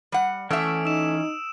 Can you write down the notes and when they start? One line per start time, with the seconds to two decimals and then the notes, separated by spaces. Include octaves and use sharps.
0.12 G3 F#5
0.50 E3 A3 C#4 E5 D#6 E6 D7
0.85 D#4 E6 E7